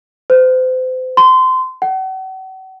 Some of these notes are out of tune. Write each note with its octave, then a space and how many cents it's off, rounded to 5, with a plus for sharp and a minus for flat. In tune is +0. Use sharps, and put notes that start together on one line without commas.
C5 -35
C6 -25
F#5 +40